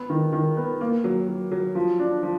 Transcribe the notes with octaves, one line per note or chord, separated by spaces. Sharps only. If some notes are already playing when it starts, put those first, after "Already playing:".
Already playing: B3
D#3
D#3
B3
A#3
F#3
F#3
F#3
F3
D4
F3